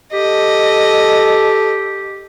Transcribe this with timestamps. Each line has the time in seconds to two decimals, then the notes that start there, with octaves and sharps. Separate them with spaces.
0.13 G4 A4 D#5